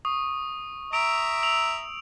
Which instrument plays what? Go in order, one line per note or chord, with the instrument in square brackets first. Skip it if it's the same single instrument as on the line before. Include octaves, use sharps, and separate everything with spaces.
[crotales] C#6 D#6
[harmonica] E5 A#5 [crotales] D7 F7
[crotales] E6 F7